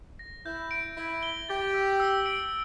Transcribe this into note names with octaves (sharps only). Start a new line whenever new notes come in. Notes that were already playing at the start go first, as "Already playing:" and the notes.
A#6
E4 G6
D7
E4 G6
G7
G4 A6
E6
E6
D7